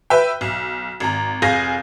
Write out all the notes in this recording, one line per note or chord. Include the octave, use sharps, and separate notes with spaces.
B4 E5 G5
B1
G#1 A#5
F1 G#4 F5 G#5 G6 A#6